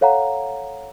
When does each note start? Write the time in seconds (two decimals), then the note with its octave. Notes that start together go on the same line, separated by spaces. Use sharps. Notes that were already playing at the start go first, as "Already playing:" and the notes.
0.01 A4 C#5 F5 F#5 A#5